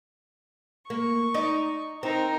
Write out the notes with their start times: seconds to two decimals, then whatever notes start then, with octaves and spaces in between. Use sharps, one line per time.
0.90 A#3 C#6
1.34 D#4 D5
2.03 C4 D#4 A#4